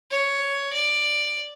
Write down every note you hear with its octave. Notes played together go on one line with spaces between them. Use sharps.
C#5
D5